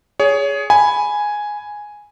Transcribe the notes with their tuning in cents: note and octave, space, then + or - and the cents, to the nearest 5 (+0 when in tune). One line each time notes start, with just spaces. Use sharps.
G#4 +0 C#5 +25
G#5 +0 B5 +0